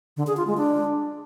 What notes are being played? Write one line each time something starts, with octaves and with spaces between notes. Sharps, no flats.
D3
G#4
F4
G#3
D4